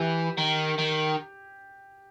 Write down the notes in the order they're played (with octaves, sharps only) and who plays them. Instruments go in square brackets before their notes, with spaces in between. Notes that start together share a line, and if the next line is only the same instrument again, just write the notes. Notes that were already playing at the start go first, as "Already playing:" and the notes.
Already playing: [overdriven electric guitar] E3 [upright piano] G4
[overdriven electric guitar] D#3
D#3